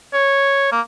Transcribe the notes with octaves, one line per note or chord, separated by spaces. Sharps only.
C#5
A#3